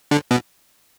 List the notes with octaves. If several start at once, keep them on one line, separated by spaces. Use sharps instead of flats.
D3
B2